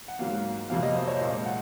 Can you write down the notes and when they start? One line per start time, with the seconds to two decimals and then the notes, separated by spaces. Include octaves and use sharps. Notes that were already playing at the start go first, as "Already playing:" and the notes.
0.08 F#5
0.19 G#2 F#3 A#3 F5
0.70 F2 C3 F#3 A#3 F5
0.83 D#5
0.95 C5
1.08 C#5
1.21 A#2 F5
1.24 G#3
1.46 F#5